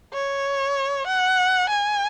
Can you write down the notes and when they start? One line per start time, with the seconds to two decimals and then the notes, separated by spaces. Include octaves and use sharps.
0.14 C#5
1.07 F#5
1.70 G#5